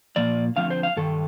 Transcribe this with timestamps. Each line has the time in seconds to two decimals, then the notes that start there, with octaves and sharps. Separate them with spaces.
0.16 A#2 F3 A#3 D5
0.56 D3 F3 A3 C4 F5
0.70 C5
0.83 F5
0.97 G2 D#3 A4